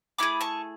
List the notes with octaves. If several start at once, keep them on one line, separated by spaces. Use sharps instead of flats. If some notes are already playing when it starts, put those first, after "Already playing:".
A3 E4 G#4 B5 D6
A5 C#6